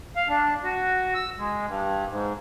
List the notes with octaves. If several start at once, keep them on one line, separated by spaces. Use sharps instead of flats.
F5
D4
F#4
E6
G#3
G2
G#2